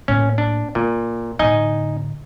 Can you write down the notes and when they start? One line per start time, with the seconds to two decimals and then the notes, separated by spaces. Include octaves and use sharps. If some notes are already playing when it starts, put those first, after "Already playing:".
0.08 A2 A#3 C#4
0.38 D4
0.75 A#2 A#3
1.39 A2 D3 D#4 D#5 G#5